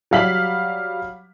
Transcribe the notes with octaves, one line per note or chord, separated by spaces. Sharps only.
F#3 G3 F5 B6 F#7